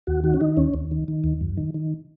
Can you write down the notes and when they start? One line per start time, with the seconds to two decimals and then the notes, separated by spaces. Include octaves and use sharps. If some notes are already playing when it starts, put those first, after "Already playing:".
0.07 D#2 F#4
0.23 D#3 F#4
0.34 C#4
0.41 D#3 D#4
0.57 D#2 C#4
0.74 D#2
0.91 D#3
1.08 D#3
1.24 D#2
1.41 F#2
1.57 D#3
1.74 D#3